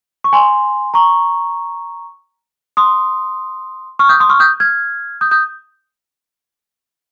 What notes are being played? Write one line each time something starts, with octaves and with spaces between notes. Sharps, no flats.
C#6
G#5 C6
A#5 C#6
C6 D#6
C#6 F6
D#6 G6
C6 D#6
C#6 F6
D#6 G6
F6 G#6
D#6 G6
D#6 G6